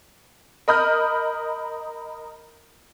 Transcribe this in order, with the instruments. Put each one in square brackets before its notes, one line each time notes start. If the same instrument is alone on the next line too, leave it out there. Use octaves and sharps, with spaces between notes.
[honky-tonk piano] A#4 D#5 B5 D#6 F6 G6